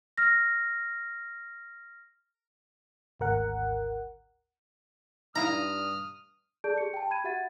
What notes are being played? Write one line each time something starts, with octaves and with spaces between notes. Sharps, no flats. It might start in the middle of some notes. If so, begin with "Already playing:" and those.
F6 A#6
G#1 D2 A#4 F#5
G2 D#4 E4 F5 A#5 D#6 F6
G#4 A4 D5 A5 G6 D7
G4 C#7
G5 A5
B5 G#6 D#7
F#4 G4 E5 F#5 A6